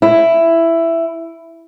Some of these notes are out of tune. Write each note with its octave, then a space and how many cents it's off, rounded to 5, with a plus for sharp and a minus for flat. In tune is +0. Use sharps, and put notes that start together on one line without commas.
E4 +10